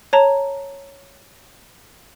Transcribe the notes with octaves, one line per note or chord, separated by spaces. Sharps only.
C#5 A5 A#5